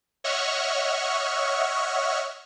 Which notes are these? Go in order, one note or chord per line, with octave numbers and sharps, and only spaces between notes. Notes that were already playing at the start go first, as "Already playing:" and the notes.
C#5 D#5 E5 F#5 C#6 F6